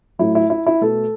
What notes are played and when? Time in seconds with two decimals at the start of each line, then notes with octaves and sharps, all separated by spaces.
0.19 A2 F#3 A3 E4
0.35 E4
0.50 E4
0.66 E4
0.81 B2 A3 A4